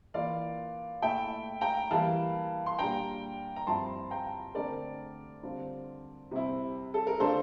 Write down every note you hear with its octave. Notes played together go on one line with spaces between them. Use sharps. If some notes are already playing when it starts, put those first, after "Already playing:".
E3 A#3 F4 D5 F5
A#2 A3 E4 E5 G5
G5 A#5
E3 G3 A#3 E4 F5 A5
C6
A#2 G3 D4 G5 A#5
A#5
G2 F3 C4 E4 A5 C6
G5 A#5
D3 A3 C4 A#4 D5
D3 G3 C4 F4
C3 G3 C4 E4
A4
A#4
D3 A3 D4 F4 A4 C5